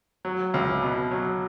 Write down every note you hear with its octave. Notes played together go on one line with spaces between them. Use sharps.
F#3
C#2
B2
F#3